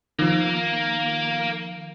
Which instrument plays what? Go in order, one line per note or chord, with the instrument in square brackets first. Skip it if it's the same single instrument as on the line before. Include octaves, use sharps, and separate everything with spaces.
[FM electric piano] D#3 F3 [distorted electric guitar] A#3